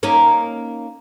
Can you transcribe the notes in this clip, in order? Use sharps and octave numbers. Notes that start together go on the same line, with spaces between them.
A#3 C#4 D#4